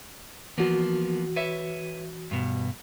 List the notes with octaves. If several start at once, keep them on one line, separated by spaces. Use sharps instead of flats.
E3 F3 A#3 B3 F#4
B4 C#5 E5
G2 B2